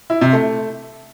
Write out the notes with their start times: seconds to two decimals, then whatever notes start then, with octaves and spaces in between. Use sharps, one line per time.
0.10 E4
0.21 C3
0.33 A3